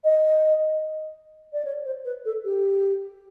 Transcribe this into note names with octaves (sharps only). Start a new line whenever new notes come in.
D#5
D5
C#5
C5
B4
A4
G4